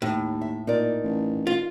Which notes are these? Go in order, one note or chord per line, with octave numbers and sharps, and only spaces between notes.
D#2 A2
E5
A#2 D#4 A#4 D5
A1
F4